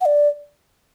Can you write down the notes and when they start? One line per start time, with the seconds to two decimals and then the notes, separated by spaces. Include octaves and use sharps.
0.01 F#5
0.06 D5